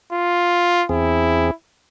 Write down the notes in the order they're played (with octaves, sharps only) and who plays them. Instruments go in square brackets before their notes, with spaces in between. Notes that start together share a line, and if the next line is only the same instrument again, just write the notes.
[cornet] F4
[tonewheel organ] E2 C4 G#4 [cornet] E4